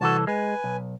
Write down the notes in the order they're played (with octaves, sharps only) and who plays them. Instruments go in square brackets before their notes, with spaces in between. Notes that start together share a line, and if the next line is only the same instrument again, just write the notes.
[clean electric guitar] C2 E3 A4 [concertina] F#4 A5
[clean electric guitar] G#3 [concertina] B4 G#5
[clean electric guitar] B1